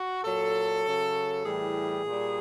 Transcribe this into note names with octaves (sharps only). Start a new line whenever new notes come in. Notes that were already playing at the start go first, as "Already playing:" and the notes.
Already playing: F#4
A#2 F#3 A4
C#3 F#3
A2 E3 G3 G#4
A#2
G3